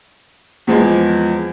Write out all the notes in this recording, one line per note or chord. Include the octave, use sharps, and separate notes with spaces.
E2 F3 G#3